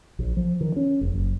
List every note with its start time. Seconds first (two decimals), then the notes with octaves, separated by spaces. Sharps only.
0.19 A#1
0.37 F3
0.61 D#3
0.76 C#4
1.01 F1
1.14 F#1